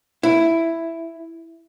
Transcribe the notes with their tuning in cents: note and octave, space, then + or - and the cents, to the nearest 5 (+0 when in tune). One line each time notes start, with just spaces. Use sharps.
E4 +5